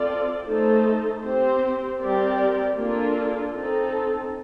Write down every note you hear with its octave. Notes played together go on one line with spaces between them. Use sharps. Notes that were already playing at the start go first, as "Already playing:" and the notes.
Already playing: C4 F4 A4 D5
A3 D#4 A4 C5
C4 G4 C5
G3 C4 G4 A#4 D5
A#3 D4 F4 A4
C4 D#4 A4